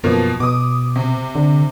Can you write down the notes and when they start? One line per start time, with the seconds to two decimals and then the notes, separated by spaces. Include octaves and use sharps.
0.04 F#2 B2 F3 A#3
0.40 B2 D6 D#6
0.96 C3
1.35 D3